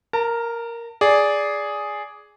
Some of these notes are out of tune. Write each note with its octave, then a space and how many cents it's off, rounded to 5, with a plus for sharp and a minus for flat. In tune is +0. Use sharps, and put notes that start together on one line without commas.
A#4 +0 A5 +40
G#4 +0 D5 -10